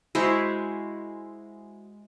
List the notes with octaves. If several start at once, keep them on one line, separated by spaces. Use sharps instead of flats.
G#3 E4 F#4 C5